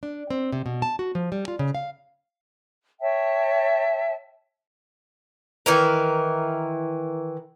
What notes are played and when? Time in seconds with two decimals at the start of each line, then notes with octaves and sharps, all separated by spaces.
0.03 D4
0.30 C4
0.52 C3
0.66 B2
0.82 A5
0.99 F#4
1.15 F3
1.32 G3
1.48 F4
1.59 C#3
1.75 F5
3.00 C#5 E5 G5 A5
5.66 D#3 E3 A#4